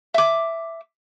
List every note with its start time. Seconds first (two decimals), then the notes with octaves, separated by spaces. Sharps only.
0.14 E5 D6